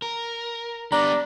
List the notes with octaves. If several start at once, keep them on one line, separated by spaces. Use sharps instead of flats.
A#4
G3 B3 D4 A#5